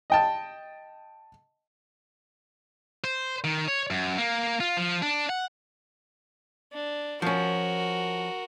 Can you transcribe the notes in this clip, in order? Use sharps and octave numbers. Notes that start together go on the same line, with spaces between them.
D#5 G5 A5
C5
D#3
C#5
F#2
A#3
F4
F3
D4
F#5
D4
F3 C#4 F#4 A#4